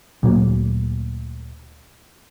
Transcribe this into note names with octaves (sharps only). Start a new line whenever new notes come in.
D2 A#2 F#3 A#3